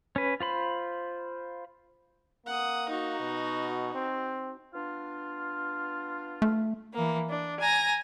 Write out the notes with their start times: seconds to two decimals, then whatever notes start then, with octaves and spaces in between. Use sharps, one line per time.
0.16 C#4 B4
0.40 F4 C5 B5
2.46 A#3 F#5 D#6
2.89 D#4 F#4
3.20 B2
3.95 C4
4.74 B3 D4 F4
6.42 A3
6.93 E3 A#3
7.29 D4
7.60 G#5 A#5 A#6